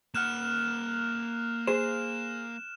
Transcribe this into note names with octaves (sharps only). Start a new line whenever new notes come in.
A#3 F#5 F6 F#6 E7
G#4 C5 E7